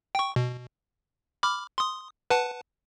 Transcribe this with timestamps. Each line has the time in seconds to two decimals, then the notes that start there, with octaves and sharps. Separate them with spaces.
0.15 G5 C#6
0.36 B2
1.43 B5 D6 F6
1.78 C6 D#6
2.30 B4 F#5 A5